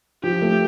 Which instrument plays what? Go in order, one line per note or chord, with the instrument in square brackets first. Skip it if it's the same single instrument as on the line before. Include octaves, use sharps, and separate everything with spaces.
[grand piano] F3 [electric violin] G4
[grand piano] A3